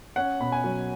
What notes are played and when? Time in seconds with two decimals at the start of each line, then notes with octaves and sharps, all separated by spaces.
0.16 C#4 F#5
0.40 B2 B5
0.52 G#5
0.64 F#3